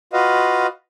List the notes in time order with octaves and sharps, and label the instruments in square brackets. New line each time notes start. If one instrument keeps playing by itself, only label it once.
[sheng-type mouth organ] F4 F#4 B4 D#5 F5